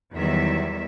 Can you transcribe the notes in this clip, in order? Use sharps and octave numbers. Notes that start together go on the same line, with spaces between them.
E2 D#3 F#3 G3 E5